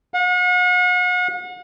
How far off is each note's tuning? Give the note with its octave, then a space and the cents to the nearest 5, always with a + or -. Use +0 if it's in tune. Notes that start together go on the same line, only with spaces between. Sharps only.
F#5 -40